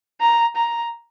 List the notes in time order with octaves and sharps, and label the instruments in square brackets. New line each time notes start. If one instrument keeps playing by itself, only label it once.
[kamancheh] A#5
A#5